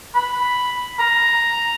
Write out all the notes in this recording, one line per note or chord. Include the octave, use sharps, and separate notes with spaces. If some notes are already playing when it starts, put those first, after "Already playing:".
B5
A#5